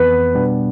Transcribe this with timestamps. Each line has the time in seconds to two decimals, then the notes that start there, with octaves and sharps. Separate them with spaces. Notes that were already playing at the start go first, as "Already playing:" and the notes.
Already playing: F2 E3 B3 B4
0.35 B2 G3 B3 D4